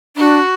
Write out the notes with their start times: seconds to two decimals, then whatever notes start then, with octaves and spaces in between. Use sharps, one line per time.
0.17 D4 F#4